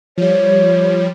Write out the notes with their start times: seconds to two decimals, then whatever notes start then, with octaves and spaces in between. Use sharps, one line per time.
0.18 F3 G3 C#5